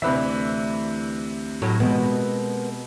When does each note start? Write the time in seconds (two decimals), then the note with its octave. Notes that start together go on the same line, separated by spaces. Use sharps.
0.02 D2 C3 E3 B4 D5 E5
1.62 A2 F#3
1.80 B2 G#3 A#3 B3